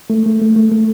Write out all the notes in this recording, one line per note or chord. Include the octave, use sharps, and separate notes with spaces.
A3
A3
A3
A3
A3